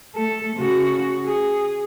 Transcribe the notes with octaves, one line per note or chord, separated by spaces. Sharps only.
A3 A4
C#3 F#4
G#4